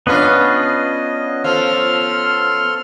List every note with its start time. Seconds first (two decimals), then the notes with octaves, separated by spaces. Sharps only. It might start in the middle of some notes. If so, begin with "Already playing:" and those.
0.07 B3 C#4 D4 F4 B4 D#5
1.44 F3 A4 C6 F6